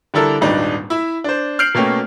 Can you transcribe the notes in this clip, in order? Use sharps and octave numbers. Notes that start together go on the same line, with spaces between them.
D3 G3 D4 E4 A4 A#4
D#1 G#1 G3 D4 D#4 B4
E4 E5
D4 C5
F6 G6 C7 D7 F#7
B2 A3 A#3 C#4 G5